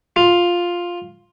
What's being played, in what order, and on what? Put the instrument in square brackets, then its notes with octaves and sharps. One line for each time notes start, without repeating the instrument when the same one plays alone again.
[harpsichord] F4